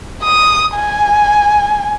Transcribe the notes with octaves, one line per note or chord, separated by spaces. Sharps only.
D#6
G#5